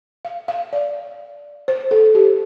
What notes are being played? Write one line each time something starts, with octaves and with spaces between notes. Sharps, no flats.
F5
F5
D5
C5
A4
G4